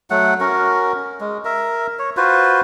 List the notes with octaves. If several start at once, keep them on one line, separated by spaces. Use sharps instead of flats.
F#3 A3 F#5
C#4 F#4 A#4
G#3
A#4 E5
C#5
F4 F#4 B4 C5